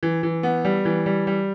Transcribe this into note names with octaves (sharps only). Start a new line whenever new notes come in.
E3
E3
B3
G3
E3
G3
G3